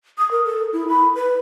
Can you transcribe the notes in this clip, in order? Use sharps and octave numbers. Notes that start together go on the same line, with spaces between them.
D#6
A#4
A4
E4
B5
B4